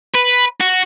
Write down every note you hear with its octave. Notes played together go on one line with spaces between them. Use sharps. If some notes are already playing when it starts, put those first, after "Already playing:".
B4
F#4